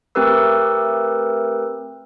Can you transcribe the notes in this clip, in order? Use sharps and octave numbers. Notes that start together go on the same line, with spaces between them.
A3 C4 G4 A#4 B4 E6